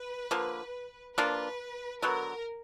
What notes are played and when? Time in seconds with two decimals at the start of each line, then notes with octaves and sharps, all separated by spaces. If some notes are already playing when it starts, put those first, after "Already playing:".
Already playing: B4
0.31 D3 F3 A#3
1.17 F3 A#3 D4 F4 B4
2.02 D3 F#3 B3 A#4